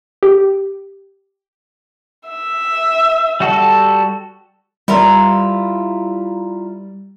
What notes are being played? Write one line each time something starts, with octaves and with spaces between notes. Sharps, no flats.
G4
E5
G3 F#4 A4
G3 E4 F4 A#4